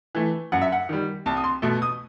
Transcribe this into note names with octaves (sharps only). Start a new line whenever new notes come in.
E3 A3
F#2 F#5
E5
F#5
D#3 G3
C2 A5
D#6
C6
B2 A3
D#6